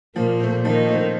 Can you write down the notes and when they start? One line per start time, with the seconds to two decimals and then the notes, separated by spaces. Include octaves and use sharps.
0.16 A#2 F3 A#3
0.40 A3 C4
0.65 D#3 F3 D#4
0.89 A3 C4